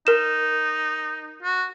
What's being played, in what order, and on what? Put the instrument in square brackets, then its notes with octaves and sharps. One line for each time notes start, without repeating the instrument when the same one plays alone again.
[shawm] D#4 [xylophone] A#4 E7
[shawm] F#4